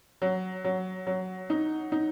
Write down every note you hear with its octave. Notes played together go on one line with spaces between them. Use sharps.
F#3
F#3
F#3
D#4
D#4